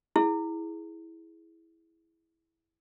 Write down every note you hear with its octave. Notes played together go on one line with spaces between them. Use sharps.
E4 G#4